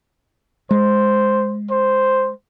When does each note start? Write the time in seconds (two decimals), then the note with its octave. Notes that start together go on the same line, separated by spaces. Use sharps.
0.71 G#3 C5
1.71 C5